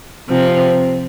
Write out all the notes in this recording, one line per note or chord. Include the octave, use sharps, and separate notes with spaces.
C3 F3 C4